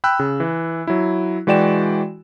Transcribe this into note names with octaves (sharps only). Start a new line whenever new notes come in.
G5 B5 E6 F#6
C#3
E3
F#3 E4
E3 G#3 F#4 D5 G5 E7